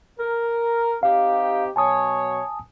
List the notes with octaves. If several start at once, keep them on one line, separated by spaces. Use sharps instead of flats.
A#4
C4 D#4 G4 F5
B2 F#3 C#5 G#5 A5 D#6